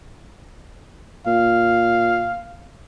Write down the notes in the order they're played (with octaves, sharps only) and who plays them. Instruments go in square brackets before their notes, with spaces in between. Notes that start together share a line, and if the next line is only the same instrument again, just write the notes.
[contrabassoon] A#2 [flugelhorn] F5